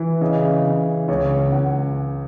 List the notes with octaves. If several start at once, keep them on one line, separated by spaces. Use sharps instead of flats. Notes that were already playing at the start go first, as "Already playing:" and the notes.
Already playing: E3
C#3 D#5
C#3
C#2 C#5
C#2 F#5